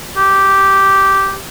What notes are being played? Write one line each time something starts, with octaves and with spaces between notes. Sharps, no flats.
G4